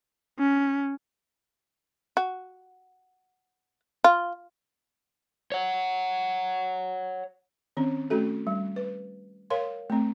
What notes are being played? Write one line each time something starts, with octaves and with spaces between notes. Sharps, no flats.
C#4
F#4
F4
C#5 F#5
D#3 C4 C#4
A3 C#4 F#4 A4
G3
B4
A#4 C#5 F5 C6
A3 C4